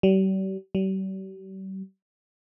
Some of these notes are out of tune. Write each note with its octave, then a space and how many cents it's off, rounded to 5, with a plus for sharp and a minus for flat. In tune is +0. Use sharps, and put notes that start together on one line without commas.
G3 -40
G3 -45